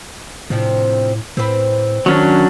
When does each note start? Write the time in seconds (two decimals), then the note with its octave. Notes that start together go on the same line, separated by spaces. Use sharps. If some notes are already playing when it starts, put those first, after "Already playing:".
0.50 A2 C3 F3 D4
1.37 A2 C4 B4
2.06 D#3 F#3 C#4 D4